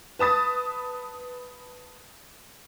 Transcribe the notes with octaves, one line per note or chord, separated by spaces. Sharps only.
B4 A5 D#6 A6